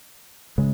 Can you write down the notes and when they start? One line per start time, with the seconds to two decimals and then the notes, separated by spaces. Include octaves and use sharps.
0.58 C#3 G#3